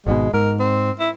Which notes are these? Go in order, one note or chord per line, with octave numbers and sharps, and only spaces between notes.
G#1 G#2 B2 G#3
G#2 A#4
C4
E4